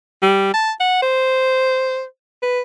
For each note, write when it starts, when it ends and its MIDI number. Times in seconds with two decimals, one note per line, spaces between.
0.22 0.51 55
0.54 0.71 81
0.80 1.00 78
1.02 2.04 72
2.42 2.61 71